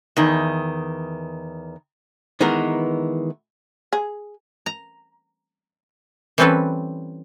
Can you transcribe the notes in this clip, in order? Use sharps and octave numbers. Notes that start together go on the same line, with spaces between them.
E2 D#3
D#3 E3 G#3 B3 A#4
G#4
A#5
E3 G3 C4 C#4 A4 B4